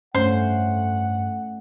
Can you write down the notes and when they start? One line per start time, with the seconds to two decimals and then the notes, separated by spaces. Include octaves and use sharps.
0.15 G2 A3 C#4 C5 F#5